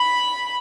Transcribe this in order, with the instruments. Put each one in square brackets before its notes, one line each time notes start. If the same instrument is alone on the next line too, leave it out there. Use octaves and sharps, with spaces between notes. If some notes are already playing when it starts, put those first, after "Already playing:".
Already playing: [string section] B5